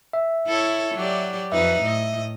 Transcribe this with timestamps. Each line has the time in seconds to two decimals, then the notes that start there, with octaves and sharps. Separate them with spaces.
0.13 E5
0.47 E4 A4 C#5
0.95 F#3 G4 D5
1.52 F2 D#4 B4 E5
1.81 A2 D#5